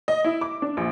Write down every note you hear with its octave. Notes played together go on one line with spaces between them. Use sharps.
D#5
E4
D6
D4
A#1